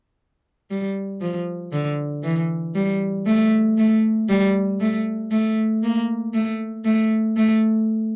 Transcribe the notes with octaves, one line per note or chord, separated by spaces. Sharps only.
G3
F3
D3
E3
G3
A3
A3
G3
A3
A3
A#3
A3
A3
A3